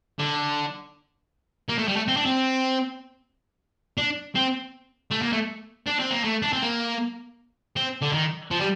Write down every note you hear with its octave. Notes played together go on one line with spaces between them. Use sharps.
D3
A#3
A3
G3
A3
C4
D4
C4
D4
C4
A3
A#3
A3
D4
C4
A#3
A3
D4
C4
A#3
C4
D3
D#3
F3
G3